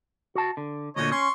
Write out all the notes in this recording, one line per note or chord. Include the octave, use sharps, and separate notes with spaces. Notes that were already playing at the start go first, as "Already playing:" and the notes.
F#4 A5
D3
D2 A#2 D3 C#5 D#5
C#4 C6 C#6